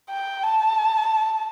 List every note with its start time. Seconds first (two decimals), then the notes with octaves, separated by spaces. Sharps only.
0.10 G5
0.43 A5